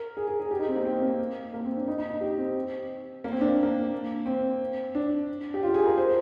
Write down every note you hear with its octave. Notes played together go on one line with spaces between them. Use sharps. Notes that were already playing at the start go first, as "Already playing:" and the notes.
Already playing: A#4
G#4
G#4
G#4
G4
D#4
C4
A#3
C4
A#3
A#3
C4
D4
D#4
D#4
D#4
G4
C4
A#3
C4
D4
A#3
A#3
C4
D4
G4
F4
G4
G#4
A#4
C5